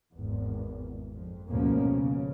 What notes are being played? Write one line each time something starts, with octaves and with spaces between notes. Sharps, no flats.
G#1 E2
F2
D2 G#2 B2 F3 A#3 C#4
C#3